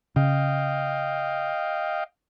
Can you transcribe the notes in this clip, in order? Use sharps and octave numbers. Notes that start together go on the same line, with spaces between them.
C#3 D#5 F5 G5